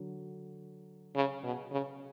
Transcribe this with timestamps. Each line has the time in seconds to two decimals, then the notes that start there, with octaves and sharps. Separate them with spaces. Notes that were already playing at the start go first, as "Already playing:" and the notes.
Already playing: D3 F#3
1.15 C#3
1.43 B2
1.71 C#3